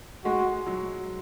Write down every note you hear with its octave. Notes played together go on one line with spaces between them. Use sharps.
G#3 F#4
F#3